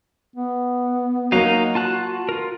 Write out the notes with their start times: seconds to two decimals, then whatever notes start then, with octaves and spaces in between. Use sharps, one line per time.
0.36 B3
1.32 F#3 A#3 D#4 F#4 F5 A#5
1.75 F4 A5 F#6
2.29 F4 A#4